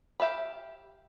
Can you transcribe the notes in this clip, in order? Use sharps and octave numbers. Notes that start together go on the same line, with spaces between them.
G4 E5 F5 B5